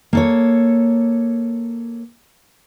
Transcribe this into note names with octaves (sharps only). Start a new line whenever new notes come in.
A#3 A4 C#5